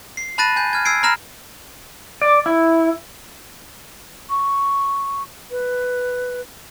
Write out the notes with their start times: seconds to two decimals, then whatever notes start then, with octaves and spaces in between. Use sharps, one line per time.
0.17 C7
0.38 A5 B5 F#6 A6 A#6 D#7
0.56 G#5 G6
0.73 F6 G#6
0.85 E6 G#6 C7 D7
1.03 A#5 B5 F6 A#6 E7
2.22 D5
2.46 E4
4.30 C#6
5.51 B4